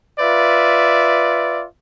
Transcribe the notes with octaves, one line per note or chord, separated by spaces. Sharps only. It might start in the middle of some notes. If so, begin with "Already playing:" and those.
F4 B4 D5 E5